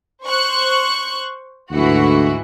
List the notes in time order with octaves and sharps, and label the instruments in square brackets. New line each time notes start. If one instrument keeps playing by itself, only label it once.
[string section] C5 C#6 F#6
[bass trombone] D2 [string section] G#2 E3 F#4